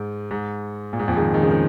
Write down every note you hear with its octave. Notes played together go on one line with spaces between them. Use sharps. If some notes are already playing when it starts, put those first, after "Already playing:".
Already playing: G#2
G#2
A#2
G#2
F2 A#2
D#3 G#3
D#3 G#3
C#3 F3
D#3 G#3